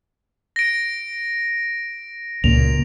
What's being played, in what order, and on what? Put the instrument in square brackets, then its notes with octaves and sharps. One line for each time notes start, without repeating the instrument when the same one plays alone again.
[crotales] A#6 D7
[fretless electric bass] C#2 A#2 [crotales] F7